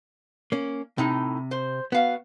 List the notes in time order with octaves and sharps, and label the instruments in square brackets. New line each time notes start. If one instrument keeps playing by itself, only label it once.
[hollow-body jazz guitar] A#3 C#4
[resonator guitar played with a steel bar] A2 D#4 [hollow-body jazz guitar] C3
[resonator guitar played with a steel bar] C5
[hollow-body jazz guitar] B3 [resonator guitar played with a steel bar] F#4 F5